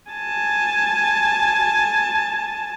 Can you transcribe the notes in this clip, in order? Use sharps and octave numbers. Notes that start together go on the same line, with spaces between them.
G#5 A5